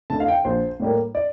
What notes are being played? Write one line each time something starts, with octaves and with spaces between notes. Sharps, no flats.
D2 D3 A5
F5
G5
A#1 C5
A2 G3 A#3
D5